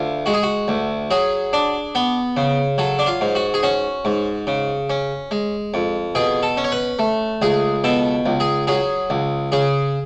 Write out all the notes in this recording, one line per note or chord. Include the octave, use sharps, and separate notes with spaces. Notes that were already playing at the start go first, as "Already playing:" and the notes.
Already playing: D2 F4
G#3 F#4
G#4
F#4
D2
F#3 G#4
D4
B3
C#3
F#3 A4
D4
F4
G#2
F#4
G#4
C#4 F#4
G#2
C#3
C#4
G#3
F2
B2 G#4
A4
C#4
C#5
B4
A3
C#2 G#4
B2 A4
C#2
G#4
F#3 G#4
C#2
C#3 G#4